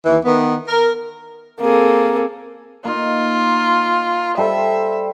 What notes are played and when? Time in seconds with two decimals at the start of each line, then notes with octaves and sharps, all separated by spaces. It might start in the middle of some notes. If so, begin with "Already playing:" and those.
0.06 D#2 E3
0.25 D#3 B3
0.68 A#4
1.61 A#3 C4 G#4 A4
2.85 A#3 D#4 F4
4.37 G3 A4 C5 E5